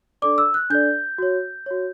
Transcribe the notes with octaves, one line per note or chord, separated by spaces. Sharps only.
D4 A4 D5 D6
E6
F#6
D4 A4 D5 G6
F#4 C#5
F#4 C#5